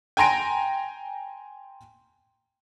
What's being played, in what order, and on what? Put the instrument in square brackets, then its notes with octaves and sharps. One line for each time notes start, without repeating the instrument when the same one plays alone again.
[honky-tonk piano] G5 G#5 A#5 C6 A#6 D7